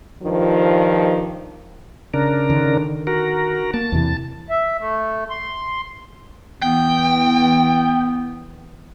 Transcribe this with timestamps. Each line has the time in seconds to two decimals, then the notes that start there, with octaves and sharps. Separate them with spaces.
0.22 G2 D#3 F3
2.14 C#3 D4 A#4
2.50 D3 D#3
3.07 F#4 A#4
3.74 A#3 A5
3.92 E2 C3 E3
4.50 E5
4.79 A3
5.30 C6
6.62 E2 E3 B3 G5